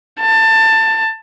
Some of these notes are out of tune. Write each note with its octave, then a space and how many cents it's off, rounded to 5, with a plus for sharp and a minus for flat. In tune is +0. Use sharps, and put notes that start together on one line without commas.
A5 +20